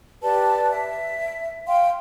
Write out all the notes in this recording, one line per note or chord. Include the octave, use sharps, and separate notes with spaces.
G4 B4 D5 A5
E5
F5 G5 C6